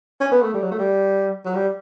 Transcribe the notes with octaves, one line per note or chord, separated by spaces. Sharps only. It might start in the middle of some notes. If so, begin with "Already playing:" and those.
C#4
B3
A3
G3
F#3
A3
G3
F#3
G3